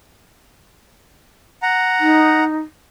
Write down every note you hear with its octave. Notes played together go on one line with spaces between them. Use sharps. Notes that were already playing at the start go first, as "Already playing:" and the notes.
F#5 A#5
D#4